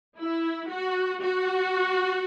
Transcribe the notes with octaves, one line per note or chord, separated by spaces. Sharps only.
E4
F#4
F#4